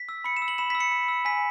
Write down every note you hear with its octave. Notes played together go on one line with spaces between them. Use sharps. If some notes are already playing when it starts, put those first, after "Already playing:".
Already playing: B6
E6
B5 C#7
E7
E6
F#7
B5 E7
E6 B6
C#7
B5
E6
G#5 B6